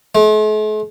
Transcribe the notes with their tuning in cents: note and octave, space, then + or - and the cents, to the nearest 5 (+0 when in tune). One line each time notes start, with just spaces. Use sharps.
A3 -45